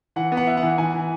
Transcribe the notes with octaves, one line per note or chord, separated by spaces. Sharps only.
E3 F#5
B3
F#5
E4
F#5
E3
E3 G#5
E3